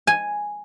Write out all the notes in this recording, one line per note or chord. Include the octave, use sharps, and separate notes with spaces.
G#5